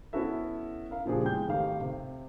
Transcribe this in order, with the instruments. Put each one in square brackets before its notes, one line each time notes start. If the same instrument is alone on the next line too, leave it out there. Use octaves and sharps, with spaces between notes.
[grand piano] B3 C#4 E4 F#4 A4 E5
A#4 F5
A#2 C#3 F3 D4 G4 G#4
E2 G#3 G#4 G5 G6
G#1 D#3 A3 G4 F5
C3